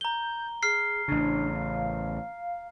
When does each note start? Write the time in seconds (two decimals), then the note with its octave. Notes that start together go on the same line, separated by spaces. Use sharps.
0.01 A#5 G6 G7
0.63 G#4 F6 C7
1.08 A1 C#3 D4
1.56 F5